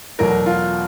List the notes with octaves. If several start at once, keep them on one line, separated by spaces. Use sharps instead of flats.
E2 B2 F#3 A3 A#4
F4